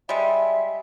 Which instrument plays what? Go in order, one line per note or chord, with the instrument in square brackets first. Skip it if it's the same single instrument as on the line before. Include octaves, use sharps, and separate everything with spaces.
[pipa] G3 G#3 [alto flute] E5